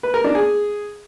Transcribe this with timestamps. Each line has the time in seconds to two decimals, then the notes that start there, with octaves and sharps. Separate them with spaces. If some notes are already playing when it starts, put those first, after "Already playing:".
0.03 B4
0.14 A#4
0.24 D4
0.35 G#4